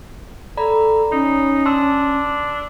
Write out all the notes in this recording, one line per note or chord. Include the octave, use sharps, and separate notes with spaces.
A4 D5 A#5 B5
C#4 D#4
D4 A5 C6 E6